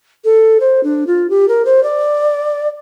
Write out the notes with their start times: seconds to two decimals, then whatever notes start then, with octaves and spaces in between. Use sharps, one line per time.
0.24 A4
0.60 C5
0.83 D4
1.06 F4
1.29 G4
1.48 A#4
1.65 C5
1.83 D5